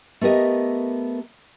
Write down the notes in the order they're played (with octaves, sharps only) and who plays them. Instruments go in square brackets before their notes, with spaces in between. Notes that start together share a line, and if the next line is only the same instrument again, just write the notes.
[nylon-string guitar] A3 B3 G4 A#4 D#5